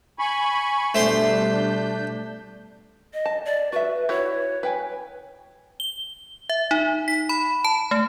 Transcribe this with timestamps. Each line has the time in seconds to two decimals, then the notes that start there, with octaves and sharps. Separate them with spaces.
0.19 G#5 B5 C#6
0.95 B2 G3 A3 D4 C5 C6 G6
3.14 D#5
3.26 A5
3.45 D5
3.72 F#4 B4 E5
4.09 E4 F#4 B4 C#5
4.63 B4 G5 G#5
5.80 G7
6.49 E5
6.71 D#4
7.08 B6
7.29 B5
7.64 A5
7.91 A3